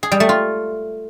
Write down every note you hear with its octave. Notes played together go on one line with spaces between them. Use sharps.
G#4
G3
A3
F4